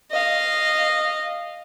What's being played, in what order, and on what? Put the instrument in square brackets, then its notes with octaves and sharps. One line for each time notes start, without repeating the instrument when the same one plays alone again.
[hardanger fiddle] D#5 F5